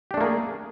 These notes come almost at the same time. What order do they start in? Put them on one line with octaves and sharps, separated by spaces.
G4 D4 A3 A#3 G#4